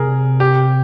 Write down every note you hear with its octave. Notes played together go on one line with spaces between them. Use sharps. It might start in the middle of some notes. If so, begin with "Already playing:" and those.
Already playing: C3 G#4 A#4
G4